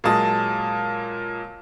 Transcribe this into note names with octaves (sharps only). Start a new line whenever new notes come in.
A#2 F#3 G#3 A5 D#6